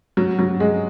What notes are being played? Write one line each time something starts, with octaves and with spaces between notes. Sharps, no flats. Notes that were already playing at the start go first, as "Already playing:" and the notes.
F#3
F#3
G#3